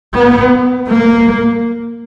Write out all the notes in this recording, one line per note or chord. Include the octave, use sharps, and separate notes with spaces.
B3
A#3